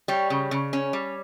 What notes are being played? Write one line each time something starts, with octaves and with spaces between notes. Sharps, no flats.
G3 C#5
C#3
C#3
C#4
G3